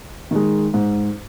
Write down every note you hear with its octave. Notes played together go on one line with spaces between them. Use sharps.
D#3 G#3
G#2